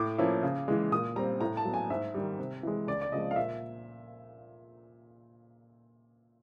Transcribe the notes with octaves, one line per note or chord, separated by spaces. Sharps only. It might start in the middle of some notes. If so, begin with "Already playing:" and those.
Already playing: A2 D6
F3 A#3 C#4 E4
C#3
E3 G#3
A#2 D#6
G3 C4 A#5
A2 A#5
A5
F#3 B3
G#5
G#2 E5
D#3 G3
C3
E3 G#3
C#2 D5
D5
C#3 F3 G#3 C4 D#5
F5
A#2 E5